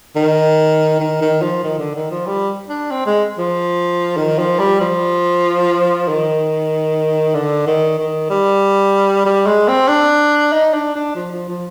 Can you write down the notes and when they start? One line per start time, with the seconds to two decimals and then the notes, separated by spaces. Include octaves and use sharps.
0.16 D#3
1.00 D#3
1.22 D#3
1.42 F3
1.64 D#3
1.79 D3
1.95 D#3
2.11 F3
2.27 G3
2.69 D4
2.91 C4
3.06 G#3
3.39 F3
4.17 D#3
4.39 F3
4.59 G3
4.81 F3
6.09 D#3
7.34 D3
7.67 D#3
7.98 D#3
8.30 G3
9.26 G3
9.47 G#3
9.68 C4
9.88 D4
10.53 D#4
10.74 D4
10.95 D4
11.15 F3
11.32 F3
11.48 F3